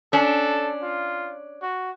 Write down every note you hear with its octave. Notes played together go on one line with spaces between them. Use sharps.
C#4 D4 A4
F4
F#4